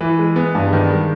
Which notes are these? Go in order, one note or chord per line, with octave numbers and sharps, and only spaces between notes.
E3
G#3
B3
G2
D#3
G#3